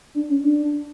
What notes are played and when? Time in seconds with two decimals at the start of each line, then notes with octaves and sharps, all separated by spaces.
0.15 D4
0.29 C#4
0.44 D4